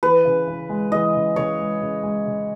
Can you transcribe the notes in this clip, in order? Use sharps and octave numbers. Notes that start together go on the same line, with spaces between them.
E3 B4
C#3
C#3
G#3
E3 D#5
C#3
C#3 C#5
G#3
C#3
G#3
C#3